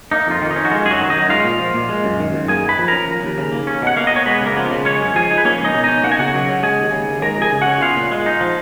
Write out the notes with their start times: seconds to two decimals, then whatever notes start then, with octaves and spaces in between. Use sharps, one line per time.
0.11 A#3 D#4
0.27 F2 F4
0.42 D#3
0.51 D#4
0.56 C#4
0.65 F#4
0.71 G#3 F4
0.85 F#2 G#4
0.91 F#3 F#4
1.01 D#3
1.10 D#4 D#5
1.16 F#2
1.30 G#3 F4 F5
1.45 A#2
1.60 F3
1.74 A#2
1.89 G#3
2.04 F#2
2.20 D#3
2.34 F#2
2.48 A#3 G#4 G#5
2.63 F#2
2.69 B4 B5
2.79 F3
2.88 C#4 A#4 A#5
3.08 F3
3.23 D#2
3.38 C#3
3.52 A#3
3.67 C#4
3.82 B2 F#5
3.97 A#3 F5
4.07 D#5
4.12 B2 C#5
4.26 G#3 B3 B4
4.41 C#3
4.46 A#3 A#4
4.56 F3
4.66 F4
4.71 C#3
4.85 G#3 C#4 C#5
5.01 F#2
5.16 F3 G#4 G#5
5.31 D#4
5.38 B4
5.45 A#3 C#4 C#5
5.59 C#2
5.64 D#4 D#5
5.74 B2
5.84 C#4 D#4 D#5
6.03 A#3 F#5
6.12 G#5
6.18 C#3 F#4 F#5
6.34 F#3
6.49 C#4
6.63 G#3 G#4 G#5
6.79 D#2
6.92 C#3
7.08 D#2
7.22 G#3 A#4 A#5
7.37 F2 G#4 G#5
7.52 C#3
7.61 C#4 F#4 F#5
7.81 B3 F4 F5
7.96 A#2
8.11 G#3
8.26 D#4
8.41 F3